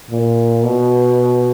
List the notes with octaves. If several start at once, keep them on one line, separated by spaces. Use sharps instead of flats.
A#2
B2